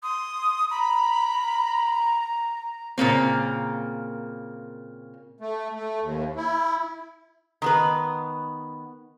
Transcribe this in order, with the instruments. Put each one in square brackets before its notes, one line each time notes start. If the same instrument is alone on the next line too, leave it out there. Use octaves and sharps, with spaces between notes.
[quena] C6 [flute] D#6
[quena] A#5 [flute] B5
[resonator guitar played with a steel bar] A#2 C#3 A#3 C4
[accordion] A3
A3
D#2
E4
[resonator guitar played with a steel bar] D#3 B3 B4